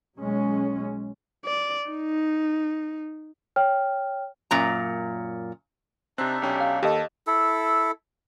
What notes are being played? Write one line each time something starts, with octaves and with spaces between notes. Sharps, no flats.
B1 F#3 G#3 C#4
D5
D#4
C#5 G5 F6
F#2 A#2 A#5
C3 C4 D4 D#4 E5 F#6
B1 C#4 G4
F5
D#2 G4 A4 D#5
E4 A4